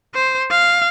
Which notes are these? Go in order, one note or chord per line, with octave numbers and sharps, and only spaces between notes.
C5
F5